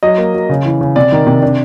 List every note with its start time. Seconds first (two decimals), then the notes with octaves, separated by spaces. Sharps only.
0.03 F#3 D#5
0.18 A#3
0.34 F#3
0.49 C#3
0.65 E3
0.81 C#3
0.96 C3 D5
1.12 D#3
1.27 C3
1.42 D4